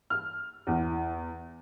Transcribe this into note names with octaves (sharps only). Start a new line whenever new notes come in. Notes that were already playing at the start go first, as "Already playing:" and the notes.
F6
E2